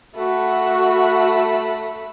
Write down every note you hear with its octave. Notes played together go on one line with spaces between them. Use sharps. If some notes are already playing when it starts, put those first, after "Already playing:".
A3 F#4 B5